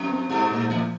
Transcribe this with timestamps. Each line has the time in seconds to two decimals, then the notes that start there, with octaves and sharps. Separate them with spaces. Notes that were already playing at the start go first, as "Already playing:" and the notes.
Already playing: F2
0.09 C4
0.30 G2 G4
0.50 A#2
0.70 G#2 F3